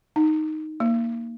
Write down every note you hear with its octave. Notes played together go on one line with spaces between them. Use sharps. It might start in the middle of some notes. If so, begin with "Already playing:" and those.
D#4
A#3